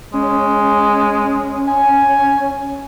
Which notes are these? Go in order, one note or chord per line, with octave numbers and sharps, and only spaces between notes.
G#3 C#4
G#5